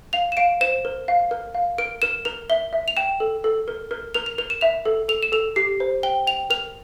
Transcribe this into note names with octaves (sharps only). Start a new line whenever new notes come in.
F5 F7
E7
F5 D7
C5 E7
A#4
F5
A#4
F5
A#4 D7
A#4 E7
A#4 F7
E5 G7
E5
F7
G5 E7
A4
A4
A#4
A#4
A#4 F7
F7
A#4 F7
E7
E5 F7
A4
A4 F7
E7
A4 F7
G4 C7
C5
G5 G7
G5 F7
A#4 F7